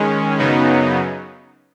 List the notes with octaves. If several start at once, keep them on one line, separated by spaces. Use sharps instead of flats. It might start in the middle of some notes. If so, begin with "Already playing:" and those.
Already playing: D#3 G#3 C#4
F#2 C#3 F#3 B3 D#4